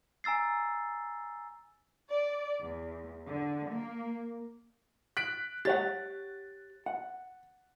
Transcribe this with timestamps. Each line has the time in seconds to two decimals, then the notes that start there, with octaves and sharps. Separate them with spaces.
0.24 G#5 A#5 E6 A6 C7
2.10 D5
2.61 E2
3.28 D3
3.70 A#3
5.17 F#6 B6 D7
5.65 G4 C#5 F#5 A6
6.86 F#5